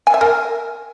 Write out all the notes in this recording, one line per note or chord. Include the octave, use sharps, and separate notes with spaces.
G#5
E5
A#4